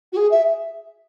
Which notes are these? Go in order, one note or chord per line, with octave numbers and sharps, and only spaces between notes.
F#4
G#4
E5